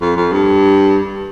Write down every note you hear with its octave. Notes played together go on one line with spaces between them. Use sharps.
F2
F2
G2